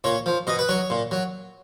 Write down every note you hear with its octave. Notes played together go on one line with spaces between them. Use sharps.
A#2 C#5
F3
B2 D#5
B4
F#3 C#5
A#2
F#3